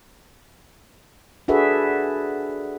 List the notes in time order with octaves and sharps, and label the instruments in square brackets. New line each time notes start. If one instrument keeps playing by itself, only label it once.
[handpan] D4 F#4 G#4 A4 B4 E5